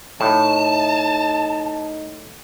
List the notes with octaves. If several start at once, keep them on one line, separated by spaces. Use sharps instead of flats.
A2 D#4 A5